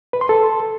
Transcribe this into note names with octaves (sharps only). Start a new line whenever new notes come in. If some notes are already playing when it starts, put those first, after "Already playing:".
B4
C6
A4